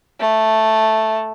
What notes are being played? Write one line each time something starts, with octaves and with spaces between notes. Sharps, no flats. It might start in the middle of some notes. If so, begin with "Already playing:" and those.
A3